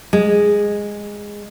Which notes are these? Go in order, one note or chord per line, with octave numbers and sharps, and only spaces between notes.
G#3